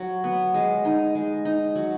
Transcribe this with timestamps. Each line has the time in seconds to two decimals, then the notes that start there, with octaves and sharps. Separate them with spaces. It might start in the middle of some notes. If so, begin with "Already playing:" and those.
Already playing: F#3
0.24 B3
0.54 G#3
0.85 D#4
1.15 G#3
1.45 D#4
1.76 F#3